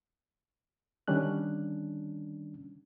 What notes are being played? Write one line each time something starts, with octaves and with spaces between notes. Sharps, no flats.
D3 D#3 G3 C#4 D4 F#6